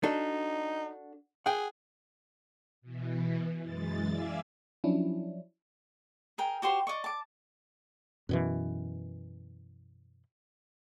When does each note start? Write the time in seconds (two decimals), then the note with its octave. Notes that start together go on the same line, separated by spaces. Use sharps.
0.03 D4 D#4 F#4 A4
1.46 G#4 F#5 G5
2.81 B2 E3
3.63 F#2 E3 G#3 A6
4.07 D5 E5 F5 G#5
4.84 F3 F#3 C#4 D4 E4
6.38 G#4 A#4 G5
6.62 F#4 G4 C5 C6
6.87 D5 D#5 C#6
7.04 A5 D6
8.29 F#2 B2 E3